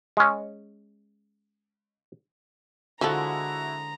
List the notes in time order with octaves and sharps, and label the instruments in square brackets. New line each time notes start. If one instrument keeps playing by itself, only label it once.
[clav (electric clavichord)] G#3 C#4
[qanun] D3 G#3 A5 [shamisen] F3 A4 [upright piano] E4 F#4 [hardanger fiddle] A#5